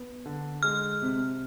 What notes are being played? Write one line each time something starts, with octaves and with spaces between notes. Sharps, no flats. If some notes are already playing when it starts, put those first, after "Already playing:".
Already playing: B3
D3
G#3 F6
C3